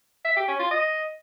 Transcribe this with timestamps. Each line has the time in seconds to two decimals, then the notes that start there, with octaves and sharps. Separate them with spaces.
0.25 E5
0.36 G4
0.48 C#4
0.59 F4
0.71 D#5